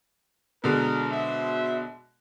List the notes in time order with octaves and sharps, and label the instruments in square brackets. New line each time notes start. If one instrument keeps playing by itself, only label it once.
[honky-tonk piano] B2 D3 G#3 [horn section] A#4
[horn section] F#4 C5 E5